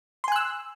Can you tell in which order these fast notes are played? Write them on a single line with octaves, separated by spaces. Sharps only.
C6 G#5 F#6 E6